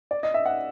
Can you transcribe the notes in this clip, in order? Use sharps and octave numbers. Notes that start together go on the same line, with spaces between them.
D5
D#5
E5
F#5